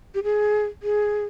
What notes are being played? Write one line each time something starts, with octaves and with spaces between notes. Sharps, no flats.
G4
G#4
G#4